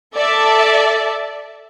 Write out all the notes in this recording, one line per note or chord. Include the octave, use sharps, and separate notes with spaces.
A4 D5 E5 A5